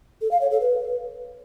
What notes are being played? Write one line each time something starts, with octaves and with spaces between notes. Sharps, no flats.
A4
F5
C#5
A4
B4